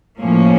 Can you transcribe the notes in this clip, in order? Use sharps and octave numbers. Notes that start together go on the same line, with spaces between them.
A2 F3 A#3 C#4